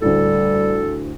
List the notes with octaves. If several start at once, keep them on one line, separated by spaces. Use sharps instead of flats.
D2 A2 G3 A4